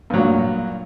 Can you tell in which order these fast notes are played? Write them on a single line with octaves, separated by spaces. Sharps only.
G2 F#3 A#2